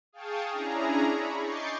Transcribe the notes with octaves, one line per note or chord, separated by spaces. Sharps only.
G#4 F5 G5 A5 C#6 D#6
C#4 D4 E4 G#4 A#5
B5 C#6
D#5 C#6 D6 G6 A6 C7